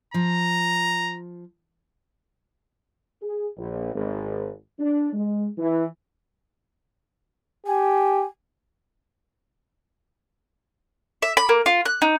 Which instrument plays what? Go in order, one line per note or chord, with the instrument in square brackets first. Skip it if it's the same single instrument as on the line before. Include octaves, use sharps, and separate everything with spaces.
[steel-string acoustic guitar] F3 [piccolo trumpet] A#5
[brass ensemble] G#4
A#1
G#1
D4
G#3
E3
[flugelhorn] G4 [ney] G#5
[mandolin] E5
B5
A#3
F4
F#6
D#4